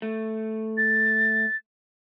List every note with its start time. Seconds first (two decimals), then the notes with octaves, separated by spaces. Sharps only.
0.02 A3
0.77 A6